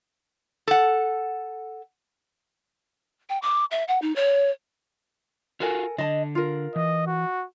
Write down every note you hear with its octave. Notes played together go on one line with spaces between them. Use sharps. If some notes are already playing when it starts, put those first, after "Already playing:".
A4 F#5
G5
D6
E5
F#5
D#4
C#5
F4 F#4 A4 A#4 G#5
D3 D#5 A5
F4 A#4
E3 D#5
F#4